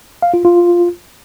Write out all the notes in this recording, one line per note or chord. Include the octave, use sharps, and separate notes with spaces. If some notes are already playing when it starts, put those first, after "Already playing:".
F5
F4
F4